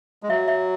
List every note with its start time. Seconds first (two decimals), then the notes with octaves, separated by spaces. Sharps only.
0.23 G#3
0.29 F#3 E5
0.48 E5